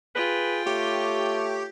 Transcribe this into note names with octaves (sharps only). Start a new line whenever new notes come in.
F4 G#4 B4 G5
A3 G4 C#5